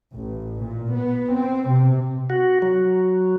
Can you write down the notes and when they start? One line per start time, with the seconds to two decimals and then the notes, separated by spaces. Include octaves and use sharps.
0.12 A1
0.62 A#2
0.94 B3
1.35 C4
1.69 C3
2.30 F#4
2.62 F#3